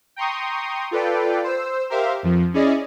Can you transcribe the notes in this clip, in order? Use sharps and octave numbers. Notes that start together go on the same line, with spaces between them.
G5 A#5 C6 C#6 D#6
F4 A4 B4 D5 G5
C5 E6
G4 A#4 C5 E5 F5
F2 F3
C#4 E4 G#4 D5 D#5